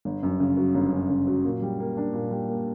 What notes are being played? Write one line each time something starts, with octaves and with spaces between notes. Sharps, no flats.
G1
F#2
C#3
F#3
G1
F#2
C#3
F#3
A#2
G3
A#3
D4
A#2
G3
A#3